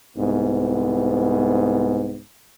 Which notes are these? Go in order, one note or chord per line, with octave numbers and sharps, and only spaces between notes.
C2 G#2 B3